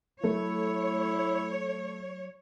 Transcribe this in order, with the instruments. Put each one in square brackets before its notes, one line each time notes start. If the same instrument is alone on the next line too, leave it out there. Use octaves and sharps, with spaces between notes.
[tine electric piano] F#3 [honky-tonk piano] A3 [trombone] E4 [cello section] C#5